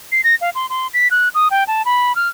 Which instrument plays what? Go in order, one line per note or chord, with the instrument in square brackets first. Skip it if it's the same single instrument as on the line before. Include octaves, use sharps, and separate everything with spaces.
[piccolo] C7
A#6
F5
C6
C6
B6
F#6
D#6
G5
A5
B5
F6